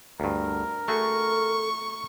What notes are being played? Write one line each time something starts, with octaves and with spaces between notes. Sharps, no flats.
D2 G2 A#4
A3 F#4 G#4 A4 C#6